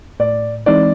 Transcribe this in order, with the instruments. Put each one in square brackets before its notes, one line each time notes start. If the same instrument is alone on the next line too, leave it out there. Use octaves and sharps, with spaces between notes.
[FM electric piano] A2 [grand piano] D5
[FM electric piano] E3 G#3 C4 D#4 [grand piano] D5